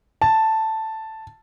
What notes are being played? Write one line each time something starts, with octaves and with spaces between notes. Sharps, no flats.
A5